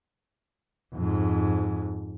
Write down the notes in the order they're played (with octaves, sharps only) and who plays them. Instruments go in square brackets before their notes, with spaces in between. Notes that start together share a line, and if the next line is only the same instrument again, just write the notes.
[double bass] F2 G#2